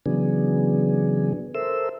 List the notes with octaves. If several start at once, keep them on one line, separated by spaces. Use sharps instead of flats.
C#3 E3 F#3 B3 D4 G#4
A4 A#4 C5 E5 E6